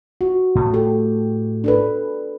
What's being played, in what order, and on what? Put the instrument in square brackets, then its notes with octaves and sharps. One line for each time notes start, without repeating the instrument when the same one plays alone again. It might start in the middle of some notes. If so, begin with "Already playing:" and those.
[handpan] F#4
[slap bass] A2 A3
[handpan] G4 A4
D4 A4 B4